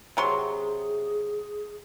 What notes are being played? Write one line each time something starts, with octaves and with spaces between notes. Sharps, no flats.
C3 F#3 G#4 C6